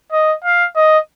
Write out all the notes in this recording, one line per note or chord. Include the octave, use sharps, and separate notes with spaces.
D#5
F5
D#5